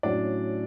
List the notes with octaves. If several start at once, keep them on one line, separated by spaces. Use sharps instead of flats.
A2 F#3 C#4 D4 D5